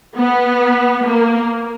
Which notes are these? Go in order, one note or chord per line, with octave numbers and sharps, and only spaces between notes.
B3
A#3